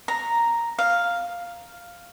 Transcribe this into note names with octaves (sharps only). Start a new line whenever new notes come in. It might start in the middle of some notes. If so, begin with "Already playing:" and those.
A#5
F5